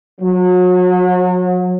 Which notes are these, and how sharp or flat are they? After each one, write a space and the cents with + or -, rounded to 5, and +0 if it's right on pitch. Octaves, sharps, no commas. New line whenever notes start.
F#3 -35